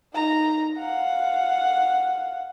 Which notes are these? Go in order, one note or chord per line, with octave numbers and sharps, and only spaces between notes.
D#4 A#5
F5 F#5